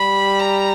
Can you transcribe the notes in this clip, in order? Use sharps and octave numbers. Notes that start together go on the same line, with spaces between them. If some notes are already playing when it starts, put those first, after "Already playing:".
Already playing: G3 B5
A#5